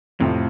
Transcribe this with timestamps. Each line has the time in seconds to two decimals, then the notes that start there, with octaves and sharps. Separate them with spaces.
0.20 F2 A2 C3 F3